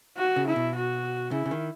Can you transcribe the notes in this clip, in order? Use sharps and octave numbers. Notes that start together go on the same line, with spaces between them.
F#4
C#3
E4
B2
F#4
C#3 E4
C#3
D#3